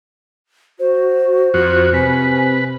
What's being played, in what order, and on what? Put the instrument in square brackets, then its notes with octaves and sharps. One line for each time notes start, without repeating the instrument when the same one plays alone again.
[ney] F#4 [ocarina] C5
[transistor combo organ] F2 F#4 [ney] F4
[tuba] C3 [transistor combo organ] B4 [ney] G#5